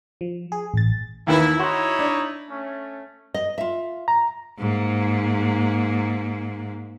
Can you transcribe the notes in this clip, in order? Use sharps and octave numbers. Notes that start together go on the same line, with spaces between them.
F3
G#4
A1 A6
D#2 D#3 E3 E4
D#4 E4 F#4 C#5 C6
D4
A3 C#4
D#5
F4 E5
A#5
G#2 A#3